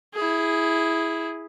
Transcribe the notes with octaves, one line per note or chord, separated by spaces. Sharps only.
E4 G#4